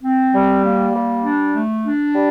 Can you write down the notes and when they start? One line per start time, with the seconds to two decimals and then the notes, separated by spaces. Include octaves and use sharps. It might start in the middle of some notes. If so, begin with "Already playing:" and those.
0.03 C4
0.33 G3
0.63 A#3
0.93 G3
1.23 D4
1.54 A3
1.84 D4
2.15 G3